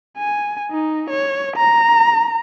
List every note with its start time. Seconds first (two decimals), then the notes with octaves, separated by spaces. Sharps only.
0.18 G#5
0.72 D#4
1.10 C#5
1.56 A#5